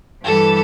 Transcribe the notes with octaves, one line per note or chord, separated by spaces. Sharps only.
G2 E3 G3 A4